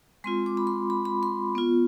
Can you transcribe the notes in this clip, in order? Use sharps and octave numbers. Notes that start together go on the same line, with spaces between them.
G#3 C4 F4 C6
D6
B5
C6
B5
B5
C6
B3 F4